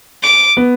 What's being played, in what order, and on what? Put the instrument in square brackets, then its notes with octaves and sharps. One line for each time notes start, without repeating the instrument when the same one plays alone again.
[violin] D6
[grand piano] B3